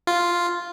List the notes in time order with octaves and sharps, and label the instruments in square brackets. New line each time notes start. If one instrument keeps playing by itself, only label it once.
[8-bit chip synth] F4